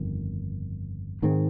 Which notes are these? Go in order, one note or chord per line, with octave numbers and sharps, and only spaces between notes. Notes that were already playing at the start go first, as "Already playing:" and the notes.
Already playing: G1 F2 D#3
G#2 D#3 G#3 C4